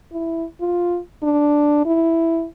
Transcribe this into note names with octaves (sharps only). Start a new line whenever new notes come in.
E4
F4
D4
E4